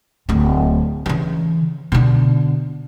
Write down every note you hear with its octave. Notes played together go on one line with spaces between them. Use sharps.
D1 D3
C#3 E3
B2 D3